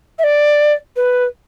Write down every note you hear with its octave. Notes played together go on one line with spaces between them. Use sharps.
E5
D5
B4